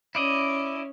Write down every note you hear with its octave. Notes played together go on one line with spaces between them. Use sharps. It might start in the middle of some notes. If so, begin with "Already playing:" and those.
C#4 E4 D5 D#5